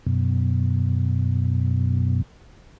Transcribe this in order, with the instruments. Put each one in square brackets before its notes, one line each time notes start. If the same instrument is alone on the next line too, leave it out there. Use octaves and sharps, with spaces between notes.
[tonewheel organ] F#2 B2